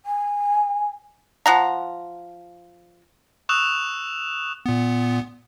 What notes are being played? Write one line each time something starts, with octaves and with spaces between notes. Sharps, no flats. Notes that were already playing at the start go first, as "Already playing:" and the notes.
G#5
F3 F#5 A#5
C#6 D#6 E6 F#6 E7 F7
A#2 B3